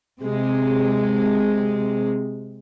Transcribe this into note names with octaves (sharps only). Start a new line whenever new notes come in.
C3 G#3